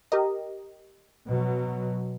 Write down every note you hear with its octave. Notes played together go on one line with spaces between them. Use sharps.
G4 A#4 D#5
B2 F#3